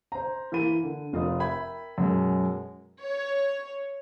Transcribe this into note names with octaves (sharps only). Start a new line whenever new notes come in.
C5 A#5
E3 A#3 B5 D#7
D3
F1 F4 A#4 D#5 D#6
A#4 E5 G5 B5 G#6
F#2 B2 G#3
C#5